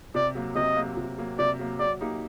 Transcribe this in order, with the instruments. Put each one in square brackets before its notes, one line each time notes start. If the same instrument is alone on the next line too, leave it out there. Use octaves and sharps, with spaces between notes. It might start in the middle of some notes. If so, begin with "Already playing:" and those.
[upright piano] C3 [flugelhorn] D5
[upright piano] F#3 A#3
[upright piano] C3 [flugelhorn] D#5
[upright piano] F#3 A#3
C3
F#3 A#3
[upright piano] C3 [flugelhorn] D5
[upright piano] F#3 A#3
[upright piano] F#3 [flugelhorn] D5
[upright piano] A#3 D#4 G4